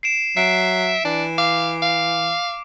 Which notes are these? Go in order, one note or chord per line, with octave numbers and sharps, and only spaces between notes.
C7 D7 E7
F#3 E5 C7 D7
E3 D4
F5 D6
F5